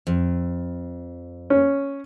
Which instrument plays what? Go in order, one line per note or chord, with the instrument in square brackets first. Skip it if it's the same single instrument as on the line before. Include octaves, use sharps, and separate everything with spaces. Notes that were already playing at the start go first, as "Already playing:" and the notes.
[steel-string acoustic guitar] F2
[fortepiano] C#4